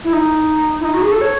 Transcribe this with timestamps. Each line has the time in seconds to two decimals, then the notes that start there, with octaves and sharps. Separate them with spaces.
0.04 E4
0.12 D#4
0.79 E4
0.84 D#4
0.93 F#4
1.02 G#4
1.11 A4
1.21 C#5